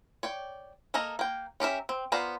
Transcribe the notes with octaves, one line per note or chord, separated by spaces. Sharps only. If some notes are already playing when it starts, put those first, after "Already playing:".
C#5 D5 G5
A#3 A4 A#4 D#5 A#5
A#3 G5
C#4 G4 A#4 E5
C4
B3 F4 C5 D5 A#5